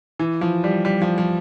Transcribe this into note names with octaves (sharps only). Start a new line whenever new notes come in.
E3
F3
G3
G3
F3
F3